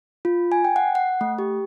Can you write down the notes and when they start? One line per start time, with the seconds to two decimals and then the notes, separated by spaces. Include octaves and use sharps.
0.25 F4
0.52 G#5
0.65 G5
0.76 F#5
0.95 F#5
1.21 A3
1.39 G4